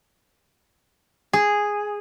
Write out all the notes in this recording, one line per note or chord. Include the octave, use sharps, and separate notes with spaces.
G#4